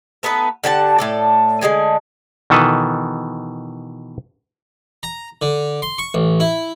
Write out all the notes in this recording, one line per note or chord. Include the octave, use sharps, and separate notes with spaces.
A3 B3 D#4 B4
D3 G4 F#5 A5
A2 A4 D5
D3 G#3 G4 G#5
B2 D#3 E3 A4 B4
A#5
D3
C6
C#6
A1
E4